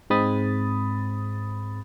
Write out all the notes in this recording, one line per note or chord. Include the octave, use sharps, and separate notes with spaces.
G#2 G#3 C4 B5 D#6 A6